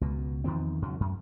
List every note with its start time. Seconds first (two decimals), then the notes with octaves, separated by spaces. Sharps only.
0.01 C#2 B2
0.44 E2 D#3 F3 C4
0.82 E2 C#3 F#3
1.00 F#2